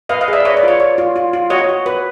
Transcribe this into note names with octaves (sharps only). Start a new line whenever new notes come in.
B4 D#5 F5
D#5 F5
G#4 D5 E5
B4 C#5 D#5
D5
F4 C#5
C#5 D5
F4
F4
F4
F#4 C#5 D#5
F#4
B4